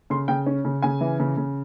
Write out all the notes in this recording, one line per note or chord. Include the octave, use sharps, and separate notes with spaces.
C#3 C6
C#3 G5
C#4
C#3
C#3 G#5
E3
C#3
C#3